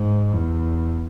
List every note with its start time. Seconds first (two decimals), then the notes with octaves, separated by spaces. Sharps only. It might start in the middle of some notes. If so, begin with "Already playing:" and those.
Already playing: G#2
0.35 E2